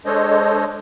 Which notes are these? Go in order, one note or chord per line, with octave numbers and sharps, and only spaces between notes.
G#3 D4 A4 C5 C#5 D#5